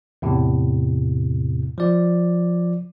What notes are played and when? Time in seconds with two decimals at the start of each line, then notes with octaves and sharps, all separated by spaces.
0.22 E2 A2 C3
1.78 F3 D5